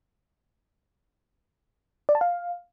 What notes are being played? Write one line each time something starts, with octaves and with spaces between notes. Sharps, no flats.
D5
A5
F5